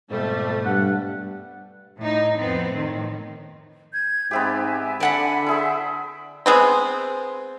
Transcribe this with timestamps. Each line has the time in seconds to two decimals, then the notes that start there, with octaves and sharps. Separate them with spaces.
0.10 F2 G#2 B2 G3 A3
0.65 G2 F#5
1.98 A2 D#4
2.38 F2 B3 C4
2.71 A2 D#3
3.92 G6 G#6
4.31 G#2 B3 C4 G4 E5 G#5
5.00 D3 D5 F#5 B5
5.46 E4 G#4 C5 E5 E6
6.46 G#3 B3 C4